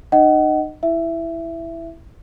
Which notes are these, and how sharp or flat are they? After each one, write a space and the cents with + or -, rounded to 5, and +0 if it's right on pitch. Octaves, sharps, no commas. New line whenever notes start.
D#4 -40 D#5 +0 F#5 +30
E4 +0 E5 +15